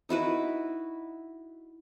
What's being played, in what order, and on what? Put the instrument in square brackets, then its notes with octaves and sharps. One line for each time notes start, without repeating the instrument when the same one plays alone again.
[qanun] D#4 E4 F#4 B4